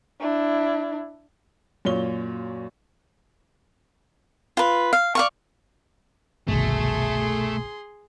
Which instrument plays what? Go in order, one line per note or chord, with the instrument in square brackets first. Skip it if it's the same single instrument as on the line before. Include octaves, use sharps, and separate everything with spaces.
[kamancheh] D4 E4
[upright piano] F#2 A#2 C#5 G7
[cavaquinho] F4 B4
F5
D5 F5 C#6
[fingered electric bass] G1 C2 D#3 [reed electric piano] B2 [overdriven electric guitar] A3 [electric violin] G#4 C6